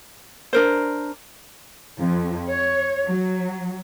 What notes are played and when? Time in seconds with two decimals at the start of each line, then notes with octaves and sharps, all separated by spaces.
0.53 D4 A#4 C5
1.97 F2
2.48 C#5
3.06 F#3